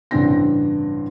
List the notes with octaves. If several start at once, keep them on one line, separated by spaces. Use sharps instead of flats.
A1 G2 C#3 C4 D4 A#6